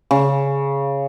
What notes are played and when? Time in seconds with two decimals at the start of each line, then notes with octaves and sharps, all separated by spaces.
0.11 C#3